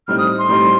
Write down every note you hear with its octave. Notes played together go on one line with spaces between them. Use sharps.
A2 G3 C4 D#4 F6
D#6
C6
A2 G3 C4 D#4